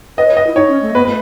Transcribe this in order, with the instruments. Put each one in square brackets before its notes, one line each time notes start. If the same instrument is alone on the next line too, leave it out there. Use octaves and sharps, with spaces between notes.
[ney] B4 [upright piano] D#5
[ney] C#5
[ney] B4 [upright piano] D#5
[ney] E4
[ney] D#4 [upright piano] C#5
[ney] C#4
A3
[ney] B3 [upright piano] B4
[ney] A3 [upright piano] B4